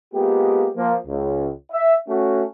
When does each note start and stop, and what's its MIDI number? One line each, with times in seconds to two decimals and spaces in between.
0.14 0.69 56
0.14 0.69 58
0.14 0.69 59
0.14 0.69 65
0.14 0.69 67
0.76 0.95 53
0.76 0.95 58
1.07 1.50 37
1.73 1.96 76
2.09 2.44 57
2.09 2.44 61
2.09 2.44 66